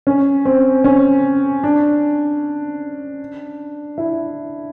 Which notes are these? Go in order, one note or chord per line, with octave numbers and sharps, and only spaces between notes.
C#4
C4
C#4
D4
E4